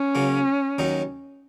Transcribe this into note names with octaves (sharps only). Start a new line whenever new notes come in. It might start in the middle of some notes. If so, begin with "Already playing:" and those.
Already playing: C#4
C#3 F#3 A#3
D#2 D#3 F#3 D#4